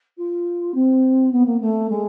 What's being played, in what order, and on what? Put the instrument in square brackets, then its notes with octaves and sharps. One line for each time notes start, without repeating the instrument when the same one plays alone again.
[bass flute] F4
C4
B3
A#3
A3
G#3